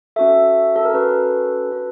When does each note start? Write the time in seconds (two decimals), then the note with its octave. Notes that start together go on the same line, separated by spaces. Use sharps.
0.16 C#4 F#4 A4 E5
0.76 A4
0.85 A#4
0.94 C#4 F#4 A4 B4
1.72 C#4 F#4 A4